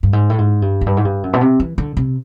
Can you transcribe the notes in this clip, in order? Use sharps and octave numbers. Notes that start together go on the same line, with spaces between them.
G2
G#2
A2
G#2
G2
F#2
G2
G#2
G2
F#2
B2
C3
E3
D3
C3